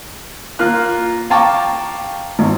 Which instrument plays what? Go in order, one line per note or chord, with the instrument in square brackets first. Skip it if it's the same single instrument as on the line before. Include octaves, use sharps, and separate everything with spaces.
[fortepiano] A#3 F4 F6 F#6
F5 G5 A5 A#5 C#6 D6
G#1